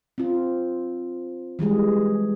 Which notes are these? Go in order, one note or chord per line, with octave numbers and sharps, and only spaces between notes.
C4 F4
E3 G3 G#3 G#4